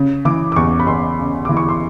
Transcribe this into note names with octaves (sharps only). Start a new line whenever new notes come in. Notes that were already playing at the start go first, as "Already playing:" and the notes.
Already playing: C#3
E3 D6
D6
E2 C#6
B5
E2 C6
C#3
E3 D6
C#6
C6